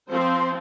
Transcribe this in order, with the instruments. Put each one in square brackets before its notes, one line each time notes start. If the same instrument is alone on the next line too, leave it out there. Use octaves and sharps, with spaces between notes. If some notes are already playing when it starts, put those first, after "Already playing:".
[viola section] F3 C4 C5